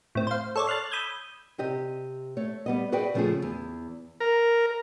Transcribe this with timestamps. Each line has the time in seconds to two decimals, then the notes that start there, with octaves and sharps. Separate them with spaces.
0.15 A2 C4
0.27 C5 F5
0.56 A4 C#5 D5
0.67 C6 F6 F#6 A6
0.91 B5 D#6 E6 G6 G#6
1.58 C3 G4 D#5
2.37 A3 C#5
2.66 G3 B3 D#5
2.92 F#4 G#4 B4 D5 E5 G5
3.14 C#3 F3 A3 C#4 F4 G#4
3.42 E2
4.20 A#4